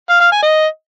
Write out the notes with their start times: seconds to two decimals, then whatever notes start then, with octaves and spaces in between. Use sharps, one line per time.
0.09 F5
0.21 F5
0.32 G#5
0.43 D#5